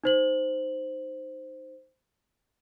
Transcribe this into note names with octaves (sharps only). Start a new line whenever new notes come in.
D#4 C5 F#7